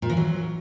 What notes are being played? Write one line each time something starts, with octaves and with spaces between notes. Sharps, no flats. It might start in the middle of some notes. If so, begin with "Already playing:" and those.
A#2
E3
F#3